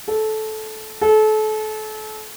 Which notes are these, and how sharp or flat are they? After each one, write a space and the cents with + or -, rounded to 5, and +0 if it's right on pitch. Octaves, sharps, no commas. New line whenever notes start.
A4 -15
A4 -30